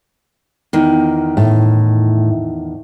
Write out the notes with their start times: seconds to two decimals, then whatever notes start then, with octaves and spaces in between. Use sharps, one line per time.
0.73 E2 D#3
1.37 A2